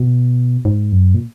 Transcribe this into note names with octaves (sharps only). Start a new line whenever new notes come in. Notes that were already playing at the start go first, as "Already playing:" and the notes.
Already playing: B2
G#2
F#2
A#2